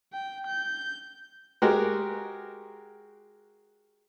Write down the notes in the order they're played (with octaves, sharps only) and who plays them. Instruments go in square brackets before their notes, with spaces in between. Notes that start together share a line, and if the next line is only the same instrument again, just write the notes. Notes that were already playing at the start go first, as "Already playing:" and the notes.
[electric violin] G5
G6
[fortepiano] G#3 F#4 G4 A#4